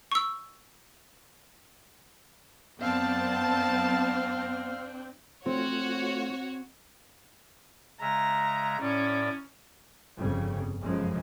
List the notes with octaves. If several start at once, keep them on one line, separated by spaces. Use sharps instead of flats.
C#6 E6
F#2 B3 C4 D4 F5 A5
A3 C4 F4 F#4 C#5
C#3 G#3 E5 A#5
A2 C#4 D5
G1 F2 C#3 G3
G1 F#2 C#3 F3 G#3